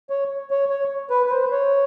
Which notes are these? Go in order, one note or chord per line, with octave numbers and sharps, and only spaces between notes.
C#5
C#5
C#5
B4
B4
C5
C#5